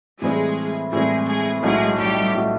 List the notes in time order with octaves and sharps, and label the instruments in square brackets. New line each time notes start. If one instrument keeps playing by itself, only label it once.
[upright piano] A2 E3 G3 C4 [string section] G#3 G#4
[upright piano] A2 E3 G3 C4 [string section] G#3 G#4
[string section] G#3 G#4
[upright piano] B1 A2 F#3 [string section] G#3 G#4
[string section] G3 G4
[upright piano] A2 F#3